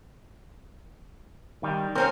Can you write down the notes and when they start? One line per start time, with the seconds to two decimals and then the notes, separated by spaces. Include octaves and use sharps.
1.63 D#3 G3
1.95 A#3 C4 C#4 C5